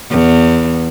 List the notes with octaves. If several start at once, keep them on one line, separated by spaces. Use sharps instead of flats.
E2